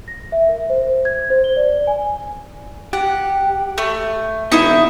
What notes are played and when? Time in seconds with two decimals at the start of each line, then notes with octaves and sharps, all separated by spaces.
0.08 A#6
0.32 E5
0.49 A#4
0.70 C5
1.05 G#6
1.30 C5
1.44 G7
1.56 D5
1.87 G#5
2.93 G4 F#5
3.78 A3
4.52 B2 E3 D#4 E4 E5